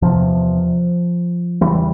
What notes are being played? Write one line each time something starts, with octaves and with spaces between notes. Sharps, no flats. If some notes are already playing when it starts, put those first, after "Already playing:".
E2 C3 F3
E2 C#3 E3 G3